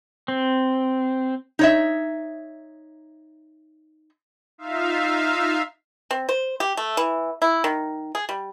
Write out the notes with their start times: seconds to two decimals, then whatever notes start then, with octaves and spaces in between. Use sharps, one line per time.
0.28 C4
1.59 D#4 C#5 E5
4.58 D#4 F4 E5 F5
6.11 C4
6.29 C5
6.60 G4
6.77 A3
6.97 E3
7.42 E4
7.64 D#3
8.15 G#4
8.29 G3